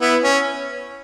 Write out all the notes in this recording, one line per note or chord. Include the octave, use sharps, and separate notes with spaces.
B3 E4
C#4